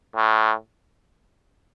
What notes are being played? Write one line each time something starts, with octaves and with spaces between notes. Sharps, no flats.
A2